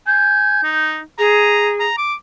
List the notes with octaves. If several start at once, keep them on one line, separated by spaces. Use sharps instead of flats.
G#5 G6
D#4
G#4 A#5
A#5
D6